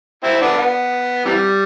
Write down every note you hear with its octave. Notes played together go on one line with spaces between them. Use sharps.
C4 E4
B3 D4
B3
C3 E3 G3